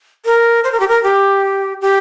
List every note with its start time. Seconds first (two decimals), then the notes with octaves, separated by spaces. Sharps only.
0.25 A#4
0.64 C5
0.72 A#4
0.80 G4
0.88 A#4
1.03 G4
1.81 G4